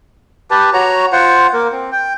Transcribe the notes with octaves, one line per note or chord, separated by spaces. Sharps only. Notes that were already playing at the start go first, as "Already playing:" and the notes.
G4 B4 A5
F#4 C#5 A#5
F4 C5 F#5
A#3 A#4
C4
G5